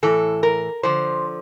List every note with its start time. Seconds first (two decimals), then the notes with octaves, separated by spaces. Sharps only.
0.03 A2 E3 A4
0.43 A#4
0.83 D3 F3 C5